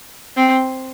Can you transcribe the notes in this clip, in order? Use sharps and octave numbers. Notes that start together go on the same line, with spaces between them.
C4